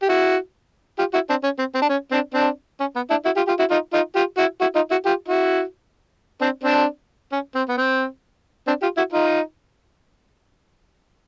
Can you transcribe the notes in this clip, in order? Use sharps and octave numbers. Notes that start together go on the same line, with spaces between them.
G4
E4 F#4
F4 G4
E4 F#4
C4 D4
C#4
C4
C4
D4
C#4
C4 D4
C4 D4
C#4
B3
D4 E4
E4 F#4
F4 G4
F4 G4
E4 F#4
D#4 F4
D#4 F4
F4 G4
E4 F#4
E4 F#4
D#4 F4
E4 F#4
F4 G4
E4 F#4
C4 D4
C4 D4
C#4
C4
B3
C4
C4 D4
F4 G4
E4 F#4
D#4 F4